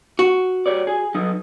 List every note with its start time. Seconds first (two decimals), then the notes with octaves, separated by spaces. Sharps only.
0.19 F#4
0.66 G4 C#5 D5
0.87 G#4
1.15 F#3 D#4